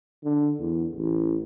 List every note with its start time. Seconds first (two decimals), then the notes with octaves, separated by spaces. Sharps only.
0.24 D3
0.59 E2
0.95 A1